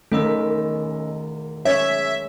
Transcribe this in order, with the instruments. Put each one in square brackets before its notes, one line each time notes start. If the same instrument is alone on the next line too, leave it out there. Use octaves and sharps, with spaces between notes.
[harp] E1 D#3 E4 [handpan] A3 [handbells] C#4 D#5 E6
[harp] G#3 [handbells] C#4 G#6 [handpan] C#5 [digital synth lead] E5